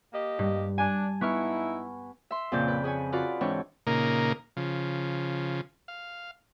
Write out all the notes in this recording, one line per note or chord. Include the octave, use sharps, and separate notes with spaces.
A#3 G4 D#5
G2
D4 G#5 A5
B3 D#4 E4 C#6 F6
E5 C6
F2 A#2 C#3 D5 G6
B4
G#4 B4 C#5 G#5
F4 F#4 B4 D5 F5
G#2 E3 C4 D4 C#5 C#6
A#2 C#3 A#3 D#4 A#4
C#3 F3
F5